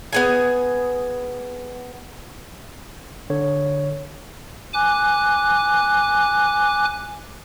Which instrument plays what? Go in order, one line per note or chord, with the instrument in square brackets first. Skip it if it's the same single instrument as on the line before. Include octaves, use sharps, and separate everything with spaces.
[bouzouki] B3 G#4 G#5
[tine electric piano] D3 C#5
[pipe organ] G#5 D6 F#6